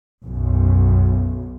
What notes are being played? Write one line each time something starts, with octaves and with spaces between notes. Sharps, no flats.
B1 F#2